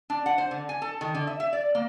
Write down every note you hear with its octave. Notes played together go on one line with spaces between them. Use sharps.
D4
F#5
C5
D3
G#5
A4
D#3
D3
E5
E5
D5
A#3